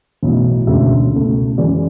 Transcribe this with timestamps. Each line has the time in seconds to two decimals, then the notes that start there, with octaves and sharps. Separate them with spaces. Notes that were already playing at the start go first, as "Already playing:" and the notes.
0.23 B1 A2 E3
0.67 E1 D2 C#3 G#3 E5
1.12 C#2 B2 A3
1.58 F#2 E3 G#3 D5